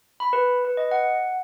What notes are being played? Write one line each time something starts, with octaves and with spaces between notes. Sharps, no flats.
B5
B4
B4
D#5
F#5